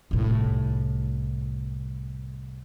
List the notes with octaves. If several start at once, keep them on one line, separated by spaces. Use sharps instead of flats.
C2 A2